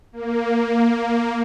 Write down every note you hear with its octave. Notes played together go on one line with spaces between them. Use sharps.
A#3